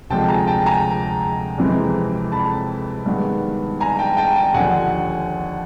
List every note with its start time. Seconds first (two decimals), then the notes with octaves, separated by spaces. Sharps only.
0.10 D2 C3 F3 G#3 G5 A5
0.28 G#5 A#5
0.47 G5 A5
0.66 G#5 A#5
1.58 F2 C3 E3 G#3 C4
2.32 A5 B5
3.06 G2 D#3 G#3 B3
3.80 G#5 A#5
3.99 G5 A5
4.17 G5 A5
4.36 G5 A5
4.54 D#2 D3 F3 F#5 G#5